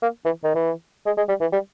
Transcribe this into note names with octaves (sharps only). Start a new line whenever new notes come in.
A#3
E3
D#3
E3
G#3
G#3
G3
E3
G3